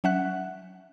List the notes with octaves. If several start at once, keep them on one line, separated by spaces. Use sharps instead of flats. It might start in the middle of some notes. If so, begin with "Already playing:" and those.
F#3 C#4 E5 F#5 F#6